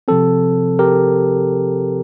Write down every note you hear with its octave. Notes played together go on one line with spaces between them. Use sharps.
C3 F3 C4 A4
G4 A#4